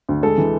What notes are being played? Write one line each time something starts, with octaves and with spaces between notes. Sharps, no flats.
D2
G#3 A4
E3